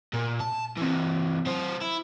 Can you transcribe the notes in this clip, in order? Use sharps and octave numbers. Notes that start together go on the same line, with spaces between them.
A#2
A5
E3 C4
F#3 C5
E4